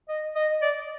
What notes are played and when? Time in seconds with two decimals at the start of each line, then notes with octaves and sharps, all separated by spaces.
0.08 D#5
0.35 D#5
0.62 D5